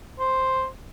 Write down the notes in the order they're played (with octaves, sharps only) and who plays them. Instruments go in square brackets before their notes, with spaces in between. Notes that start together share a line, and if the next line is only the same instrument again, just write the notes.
[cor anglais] C5